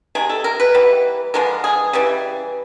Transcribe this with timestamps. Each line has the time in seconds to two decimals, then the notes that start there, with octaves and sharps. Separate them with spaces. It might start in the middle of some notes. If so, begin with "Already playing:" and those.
0.15 C3 D#3 G#4
0.29 A4
0.44 A#4
0.60 B4
0.74 E3 G3 B3
1.34 D3 F3 G#3 B3 A#4
1.64 G#4
1.93 C#3 E3 G3